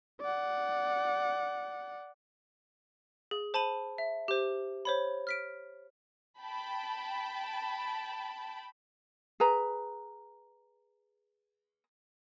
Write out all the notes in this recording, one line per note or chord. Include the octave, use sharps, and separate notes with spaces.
D5 F#5
G#4
C5 A5 B5 D#7 F#7
E5
G4 C5
C5 C#5 B5
F6 B6 D7
G5 A5 B5
G#4 B4 A#5